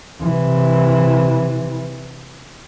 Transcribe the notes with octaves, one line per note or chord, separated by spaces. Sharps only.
C3 E3